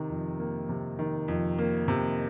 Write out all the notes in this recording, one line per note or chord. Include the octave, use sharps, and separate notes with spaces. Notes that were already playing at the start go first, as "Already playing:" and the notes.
Already playing: C3 D#3
F2
A#3
C3
D#3
F2
A#3
C3